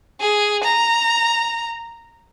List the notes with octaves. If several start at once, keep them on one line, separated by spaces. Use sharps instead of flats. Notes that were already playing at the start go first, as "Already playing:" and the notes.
G#4
A#5